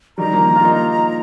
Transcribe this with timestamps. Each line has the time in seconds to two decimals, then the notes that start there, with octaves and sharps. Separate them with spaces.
0.18 D#3 G3 A#5
0.33 F3 A#3
0.56 F4
0.65 A#3 D#4